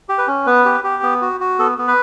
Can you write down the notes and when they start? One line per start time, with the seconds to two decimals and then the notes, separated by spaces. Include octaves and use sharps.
0.09 G4
0.18 B4
0.27 C#4
0.46 B3 B4
0.65 G4
0.84 G4
1.03 B3
1.22 F#4
1.40 F#4
1.59 B3 A4
1.78 B3
1.88 B4